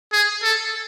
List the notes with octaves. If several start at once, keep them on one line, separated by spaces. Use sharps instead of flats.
G#4
A4